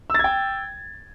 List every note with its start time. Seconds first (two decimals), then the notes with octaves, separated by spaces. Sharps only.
0.10 E6
0.14 A6
0.19 G#6
0.24 G5